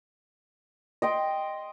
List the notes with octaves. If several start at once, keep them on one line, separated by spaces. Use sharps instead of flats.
D#5 G5 C6